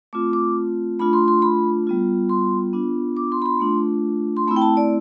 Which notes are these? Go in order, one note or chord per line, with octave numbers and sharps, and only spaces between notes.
A3 C4 F4 D6
D6
A3 D4 F4 B5
C6
C6
B5
G3 B3 F4
C6
B3 D4 F4
D6
C6
B5
C6
A3 D4 F4
C6
A3 C4 E4 B5
G5
A5
D5